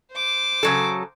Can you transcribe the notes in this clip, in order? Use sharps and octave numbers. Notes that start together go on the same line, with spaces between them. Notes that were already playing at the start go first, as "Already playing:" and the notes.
C5 D6
C#3 F#3 A4